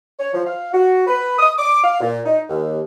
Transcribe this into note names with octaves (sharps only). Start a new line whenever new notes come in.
C#5
F3
F5
F#4
B4
D#6
D6
F5
A#2
D#4
D#2